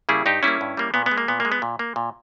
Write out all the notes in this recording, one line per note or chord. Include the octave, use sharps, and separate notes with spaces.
C#3 G3 A#3 E4 G#4
G2 D#4 G4
G3 A#3 C#4 E4
G2
G3 A#3
A#2 B3
B3
G#3
A#3
A#2 B3
G#3 A#3
B3
A#2
A#3
A#2